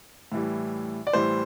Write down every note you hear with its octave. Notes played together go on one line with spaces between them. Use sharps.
A2 E3 G3
D5
A2 E3 G3 C5